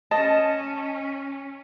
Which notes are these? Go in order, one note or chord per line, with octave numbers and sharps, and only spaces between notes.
C#4 D#5 A5